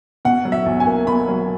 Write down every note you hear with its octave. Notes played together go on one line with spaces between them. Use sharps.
B2 F#5
F#3
E5
B1
G#5
A#3
B2 B5
F#3